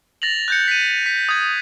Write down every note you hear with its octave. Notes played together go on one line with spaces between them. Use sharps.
A6 A#6 F7 F#7
F#6 G6 C#7
B6 D#7
B6
D#6 G#6